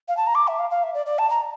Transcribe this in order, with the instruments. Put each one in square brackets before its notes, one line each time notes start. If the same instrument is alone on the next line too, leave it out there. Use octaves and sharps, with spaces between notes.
[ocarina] F5
A5
A#5
D6
E5
F5
F5
E5
D5
D5
A5
A#5